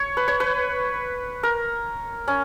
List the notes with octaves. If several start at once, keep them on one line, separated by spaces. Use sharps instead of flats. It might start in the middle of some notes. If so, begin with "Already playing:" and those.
Already playing: C#5
B4
C#5
B4
A#4
C#4